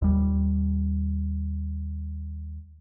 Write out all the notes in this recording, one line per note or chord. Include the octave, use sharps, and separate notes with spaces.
D#2 G3